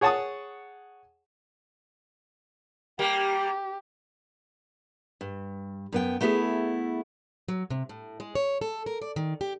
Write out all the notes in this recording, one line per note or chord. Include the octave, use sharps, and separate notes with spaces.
G#4 C#5 F#5 A5 C#6 D#6
G3 A#3 G4
G2
F#2 B3 G5
A3 B3 E4 F#4 G#4 A4
F#3
C3
A2
G#3
C#5
A4
A#4
D5
D#3
G4